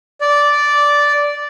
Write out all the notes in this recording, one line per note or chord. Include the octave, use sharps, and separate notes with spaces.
D5